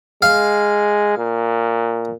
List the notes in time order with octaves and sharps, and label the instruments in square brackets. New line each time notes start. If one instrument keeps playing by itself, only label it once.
[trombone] G#3 [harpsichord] F5
[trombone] A#2